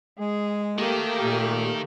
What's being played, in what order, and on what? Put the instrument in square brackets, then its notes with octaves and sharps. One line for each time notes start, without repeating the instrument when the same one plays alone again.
[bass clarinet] G#3 [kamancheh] G#4
[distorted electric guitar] D#3 [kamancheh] A3 F5 [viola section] A#3 G4
[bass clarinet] A#2